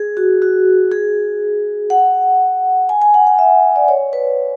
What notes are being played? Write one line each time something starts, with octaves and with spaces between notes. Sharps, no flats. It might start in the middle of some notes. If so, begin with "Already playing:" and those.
Already playing: G#4
F#4
F#4
G#4
F#5
G#5
G#5
F#5
F#5
E5
D5
C#5
B4